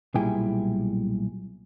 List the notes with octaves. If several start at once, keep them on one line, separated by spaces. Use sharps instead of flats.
B1 A#2 G3 E4 G#4 G5